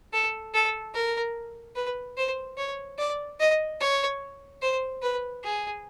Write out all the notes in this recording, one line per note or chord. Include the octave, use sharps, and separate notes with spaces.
A4
A4
A#4
B4
C5
C#5
D5
D#5
C#5
C5
B4
G#4